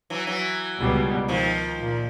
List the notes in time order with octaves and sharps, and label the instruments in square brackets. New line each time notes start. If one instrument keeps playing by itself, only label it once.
[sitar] E3 F#3
E3 F#3
[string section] C#2 B2 G3
[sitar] D#3 F3
[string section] A#2